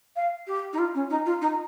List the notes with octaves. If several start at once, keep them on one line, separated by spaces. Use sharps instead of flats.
F5
G4
D#4
F4
C#4
D#4
F4
D#4